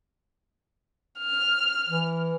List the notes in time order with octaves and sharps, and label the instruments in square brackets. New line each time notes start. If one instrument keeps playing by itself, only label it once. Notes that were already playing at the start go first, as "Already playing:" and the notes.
[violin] F6
[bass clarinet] E3